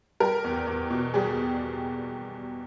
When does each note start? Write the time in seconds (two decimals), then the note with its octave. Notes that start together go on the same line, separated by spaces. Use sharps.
0.20 G3 A#4
0.44 E2
0.67 E2
0.90 B2
1.14 G3 G#4